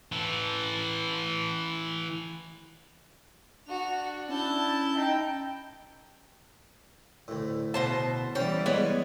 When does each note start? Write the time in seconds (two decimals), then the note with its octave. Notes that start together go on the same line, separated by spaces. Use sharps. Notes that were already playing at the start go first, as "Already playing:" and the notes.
0.12 E3 A4
3.68 D4 F#4 F7
4.29 C#4 E4 A5 G6
4.96 D#4 G5
7.28 D2 A2
7.74 B2 C5 A5
8.35 E3 G3 C#4 C5 D5 G5 A5
8.66 G#3 B3 C#5